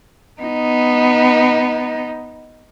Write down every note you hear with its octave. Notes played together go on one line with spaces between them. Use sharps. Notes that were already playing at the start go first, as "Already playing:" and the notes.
B3 D#4